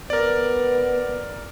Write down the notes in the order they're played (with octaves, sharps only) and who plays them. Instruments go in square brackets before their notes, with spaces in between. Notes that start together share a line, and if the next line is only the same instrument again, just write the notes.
[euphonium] B3 [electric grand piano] A#4 D5